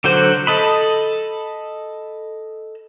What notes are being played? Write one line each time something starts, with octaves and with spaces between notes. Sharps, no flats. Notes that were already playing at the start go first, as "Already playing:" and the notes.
D3 F#3 F#4 C5
A4 D#5 B5